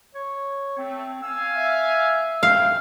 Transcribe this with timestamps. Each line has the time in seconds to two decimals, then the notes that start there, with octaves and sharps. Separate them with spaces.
0.15 C#5
0.78 A3 C4
1.22 F5 G#5 E6
1.56 E5
2.43 E4 F5 G5